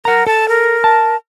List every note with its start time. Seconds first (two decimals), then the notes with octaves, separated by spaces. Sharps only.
0.05 A#4 F#5 A#5
0.27 A4 A5
0.49 A#4
0.84 A5